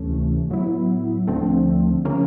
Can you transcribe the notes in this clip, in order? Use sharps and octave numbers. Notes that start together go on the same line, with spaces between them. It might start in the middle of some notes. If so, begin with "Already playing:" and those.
Already playing: D2 C3 E3 A3 C#4
A2 F#3 B3 E4
D2 D3 F3 A3 C4
C#3 F3 A#3 C#4